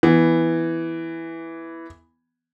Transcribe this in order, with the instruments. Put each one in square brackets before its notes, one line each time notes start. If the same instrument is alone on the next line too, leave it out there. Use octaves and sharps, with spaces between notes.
[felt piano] E3 B3